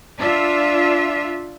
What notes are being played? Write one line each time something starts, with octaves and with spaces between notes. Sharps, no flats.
D4 F4 E5